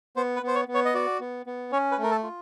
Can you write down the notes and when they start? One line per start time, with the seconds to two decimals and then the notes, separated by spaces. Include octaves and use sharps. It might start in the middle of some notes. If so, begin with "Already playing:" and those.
0.16 B3 C5
0.36 B4
0.43 B3 C5
0.55 C#5
0.68 B3
0.74 C#5
0.85 D#5
0.94 F#4 D5
1.20 B3
1.46 B3
1.72 C#4 C#5
1.92 B4
1.98 A3
2.03 A#4
2.11 A4
2.23 F4